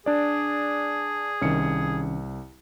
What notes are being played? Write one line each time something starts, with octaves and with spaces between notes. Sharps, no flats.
D4 G#4 D5
C2 D#3 C#4 C#7